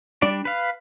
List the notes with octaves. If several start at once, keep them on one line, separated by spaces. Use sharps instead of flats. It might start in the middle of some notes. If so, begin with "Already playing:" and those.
G3 D4 D5
B4 F5